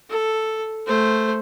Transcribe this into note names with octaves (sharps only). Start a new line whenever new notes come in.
A4
A3 C5